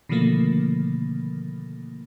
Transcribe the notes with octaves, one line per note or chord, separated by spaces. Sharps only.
B2 D3 D#3 F3 A3 A#3